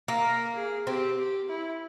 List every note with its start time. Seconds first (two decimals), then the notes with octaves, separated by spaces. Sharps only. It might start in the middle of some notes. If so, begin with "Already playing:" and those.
0.08 A#3
0.24 A#4
0.55 G#4
0.87 C4 G4
1.18 G4
1.49 E4